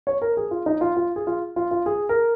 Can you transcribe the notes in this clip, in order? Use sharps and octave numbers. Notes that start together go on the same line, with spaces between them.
C#5
A#4
G#4
F4
D#4
F4
F4
G#4
F4
F4
F4
G#4
A#4